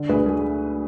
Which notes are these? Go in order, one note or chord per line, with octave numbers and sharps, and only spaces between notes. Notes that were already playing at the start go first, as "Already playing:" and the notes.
Already playing: D3
D2 G#4 B4
A3 G#4